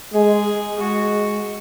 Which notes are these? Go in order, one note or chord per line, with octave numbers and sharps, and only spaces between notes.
G#3 G#4
G#3 F#4